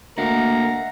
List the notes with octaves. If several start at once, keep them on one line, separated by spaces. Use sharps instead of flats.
D2 A#3 A#4 D#5 E5 F#5 A#5